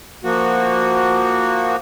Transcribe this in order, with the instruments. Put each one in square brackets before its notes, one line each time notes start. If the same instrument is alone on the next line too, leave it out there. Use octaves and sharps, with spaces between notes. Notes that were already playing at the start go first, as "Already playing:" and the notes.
[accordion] F3 A#3 F#4